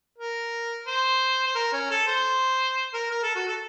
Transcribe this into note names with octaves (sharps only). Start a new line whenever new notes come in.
A#4
C5
C5
A#4
C#4
A4
C5
A#4
A#4
A4
F#4
A4